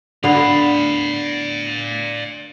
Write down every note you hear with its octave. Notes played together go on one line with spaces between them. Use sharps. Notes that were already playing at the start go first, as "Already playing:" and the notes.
D3 B3 D5 F5